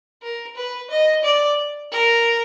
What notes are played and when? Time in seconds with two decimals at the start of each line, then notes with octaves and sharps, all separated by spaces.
0.22 A#4
0.56 B4
0.90 D#5
1.24 D5
1.92 A#4